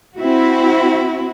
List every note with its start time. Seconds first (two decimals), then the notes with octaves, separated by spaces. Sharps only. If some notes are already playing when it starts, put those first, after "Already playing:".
0.17 C4 E4 F#4